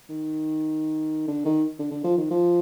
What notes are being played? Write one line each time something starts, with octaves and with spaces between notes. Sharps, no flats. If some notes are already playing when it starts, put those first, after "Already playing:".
D#3
D3
D#3
D3
D3
F3
D#3
F3